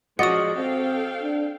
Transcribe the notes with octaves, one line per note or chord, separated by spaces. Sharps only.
F3 G#3 C#4 F#4 D5 D#5 F#5 D#6
C4 A4 F5 G5
D4